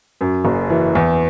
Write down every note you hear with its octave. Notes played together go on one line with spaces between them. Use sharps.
F#2
F#1
E3
E2